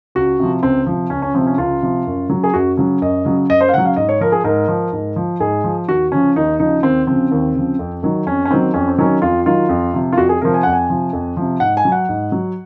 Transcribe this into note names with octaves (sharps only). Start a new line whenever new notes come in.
C#2 F#4
C3 F3
C#2 C4
C3 F3
C#2 C#4
C#4
C3 F3 C4
C#4
C#2 F4
C3 F3
F#2
C#3 F#3
G#4
F#2 F#4
C#3 F#3
F#2 D#5
C#3 F#3
F#2 D#5
C5
F5
C#3 F#3 F#5
F5
G#2 D#5
C#5
F3 A#4
G#4
G#2 A#4
F3
G#2
F3
G#2 G#4
F3
D#2 F#4
C#3 F3 C#4
D#2 D#4
C#3 F3 D#4
D#2 C4
C#3 F3 C4
D#2
C#3 F3
F2
D#3 F#3
F2 C#4
C#4
D#3 F#3 C4
F2 C#4
C4
D#3 F#3 C#4
F2 F4
D#3 F#3 F4
F2
C3 F3
F4
F2 F#4
G#4
C3 F3 A#4
G#5
F2 F#5
G#5
C3 F3
F2
C3 F3
G#2 F#5
G#5
F#3
F#5
G#2
F#3